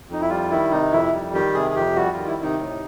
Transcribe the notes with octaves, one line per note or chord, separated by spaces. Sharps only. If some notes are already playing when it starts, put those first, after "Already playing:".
F2 D#4
E4
G3 F4
D#3 E4
C3 D#4
F2 E4
G3
D#3 G4
C3 G#4
G#4
F2 G4
G3 F#4
F4
D#3
E4
C3
D#4
A2